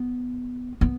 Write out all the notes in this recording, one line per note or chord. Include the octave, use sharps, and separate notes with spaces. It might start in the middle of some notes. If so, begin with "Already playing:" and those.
Already playing: B3
B3